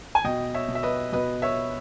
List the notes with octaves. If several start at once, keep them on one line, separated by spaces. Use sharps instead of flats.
G#5
B2 D#5 G5
C#5 E5
B2
E5
B4 D#5
B2 B4 D#5
C#5 E5